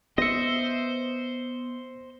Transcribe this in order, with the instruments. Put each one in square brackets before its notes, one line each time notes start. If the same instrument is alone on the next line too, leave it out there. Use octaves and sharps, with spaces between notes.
[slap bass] B3 [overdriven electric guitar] C5 [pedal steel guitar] D#5 E5 [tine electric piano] A#6 C#7